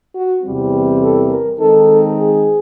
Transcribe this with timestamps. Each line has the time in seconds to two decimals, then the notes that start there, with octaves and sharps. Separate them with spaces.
0.15 F#4
0.44 E2 C3 E3 G3 C4
1.02 A4
1.30 A#4
1.60 D#3 G#3 C4 D#4 A4
2.18 G#4